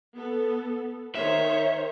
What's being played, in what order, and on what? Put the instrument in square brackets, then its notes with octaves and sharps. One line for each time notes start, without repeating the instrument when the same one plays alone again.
[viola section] B3 A4
[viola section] D#3 C5 C#5 [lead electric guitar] E5